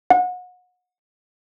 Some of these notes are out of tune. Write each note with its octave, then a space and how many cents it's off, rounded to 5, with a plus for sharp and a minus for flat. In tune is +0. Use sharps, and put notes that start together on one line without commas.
F#5 -30